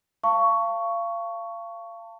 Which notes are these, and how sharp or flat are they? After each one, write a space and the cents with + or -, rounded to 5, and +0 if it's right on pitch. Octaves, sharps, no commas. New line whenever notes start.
F5 -30 A5 +25 C#6 +10